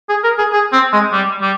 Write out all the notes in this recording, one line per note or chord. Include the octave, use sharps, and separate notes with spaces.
G#4
A#4
G#4
G#4
C4
G#3
G3
G3